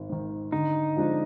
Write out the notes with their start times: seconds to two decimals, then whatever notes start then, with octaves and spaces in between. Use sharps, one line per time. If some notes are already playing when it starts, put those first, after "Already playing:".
Already playing: G#1
0.09 G#2 D#3
0.52 D3 D#4
0.96 F3 G#3 D4 F4